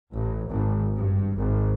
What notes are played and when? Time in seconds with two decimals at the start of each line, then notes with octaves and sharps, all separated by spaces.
0.13 A1
0.48 G#1
0.96 G2
1.37 G#1